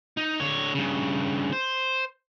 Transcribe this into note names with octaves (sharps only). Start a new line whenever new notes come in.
D#4
D3 C#5
G2 C#3
C5